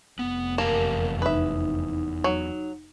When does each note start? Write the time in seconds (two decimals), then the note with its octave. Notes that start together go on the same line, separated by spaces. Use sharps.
0.19 F1 B3
0.58 E2 A#3 G4 A#4 A5
1.22 D#4 B4 E5
2.24 F#3